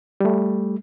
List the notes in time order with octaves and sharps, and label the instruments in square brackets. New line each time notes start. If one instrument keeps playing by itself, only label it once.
[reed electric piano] G3 A3